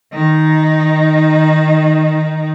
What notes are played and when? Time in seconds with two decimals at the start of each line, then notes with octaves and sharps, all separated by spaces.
0.13 D#3 D#4